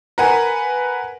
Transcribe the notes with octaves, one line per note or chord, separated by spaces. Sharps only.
A#4 B4 F#5 G#5